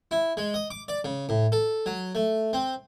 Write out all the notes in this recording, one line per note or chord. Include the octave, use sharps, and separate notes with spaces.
E4
G#3
D#5
D6
D5
C#3
A2
A4
F#3
A3
C4